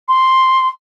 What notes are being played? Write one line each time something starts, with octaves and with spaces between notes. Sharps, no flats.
C6